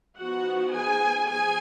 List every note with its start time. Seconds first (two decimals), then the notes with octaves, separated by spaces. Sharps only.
0.18 F3 B3 D#4 F#4 F#5
0.73 G#4 G#5
1.28 F3 G#4 G#5